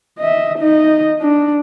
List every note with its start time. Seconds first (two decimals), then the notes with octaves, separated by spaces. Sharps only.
0.19 D#5 E5
0.58 D#4 D#5
1.21 D4